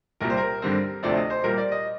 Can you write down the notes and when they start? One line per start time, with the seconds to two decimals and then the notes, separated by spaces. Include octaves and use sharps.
0.20 C2 A#2 G3 A#4
0.30 C5
0.37 A#4
0.62 G2 D3 G3 C4
1.03 D2 C3 F3 A3 C4 D5
1.17 D#5
1.30 C5
1.44 A#2 G3 A#3 A#4
1.58 D5
1.72 D#5